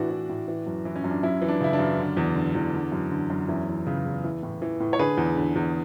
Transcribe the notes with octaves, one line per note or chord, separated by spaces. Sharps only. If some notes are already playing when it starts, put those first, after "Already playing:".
Already playing: A2 E3 D4 F#4
E3
A2
E3
F#2
E3
C#4
F#2
D4
F#2 C#4 E4
E3
D4
C#3 E4
D4
F#2
D3
E2
D3
E2
D3
F#2
D3
F#2
E2 C#4 E4
E3
C#3
E2
E3
A2
E3
A2
C#5
D3 G#4 B4
E2
D3
E2